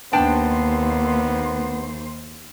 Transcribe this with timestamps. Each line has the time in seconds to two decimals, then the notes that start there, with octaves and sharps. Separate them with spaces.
0.13 D#2 B3 D4 C5 G5 A5